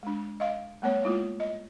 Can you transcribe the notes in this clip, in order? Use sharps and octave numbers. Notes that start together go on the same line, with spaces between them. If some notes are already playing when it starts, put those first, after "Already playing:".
G#3 D4
D#5 F5
G3 A3 B3 C#5
G#3 A#3 E4 F4
D#5